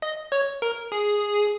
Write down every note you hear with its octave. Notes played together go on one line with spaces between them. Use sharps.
D#5
C#5
A#4
G#4